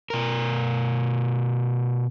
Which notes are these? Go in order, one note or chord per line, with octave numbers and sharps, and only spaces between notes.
B2 A#4